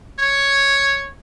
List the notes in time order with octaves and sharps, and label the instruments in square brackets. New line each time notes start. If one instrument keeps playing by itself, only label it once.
[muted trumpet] C#5